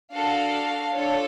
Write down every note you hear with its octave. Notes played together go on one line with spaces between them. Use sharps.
D4 F#4 A4 F5
D4 F4 A4 C#5